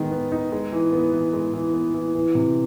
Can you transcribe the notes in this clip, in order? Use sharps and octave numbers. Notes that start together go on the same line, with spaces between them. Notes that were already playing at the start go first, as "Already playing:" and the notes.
Already playing: D#3 G#3 B3 D#4
B3
D#4
G#3
E3
B3
E3
G#3
E3
B3
E3
E3
C3